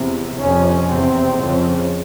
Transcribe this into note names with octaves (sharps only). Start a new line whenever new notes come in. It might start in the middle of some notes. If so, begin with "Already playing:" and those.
Already playing: E2 C3
F2 C3 C#4
E2 C3 C4
F2 C#3